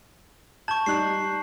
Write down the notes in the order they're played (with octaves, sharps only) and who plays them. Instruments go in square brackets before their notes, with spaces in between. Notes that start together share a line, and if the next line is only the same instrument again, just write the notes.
[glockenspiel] A5 C#6 [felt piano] G6
[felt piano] G3 D#4 F#6 [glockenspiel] C7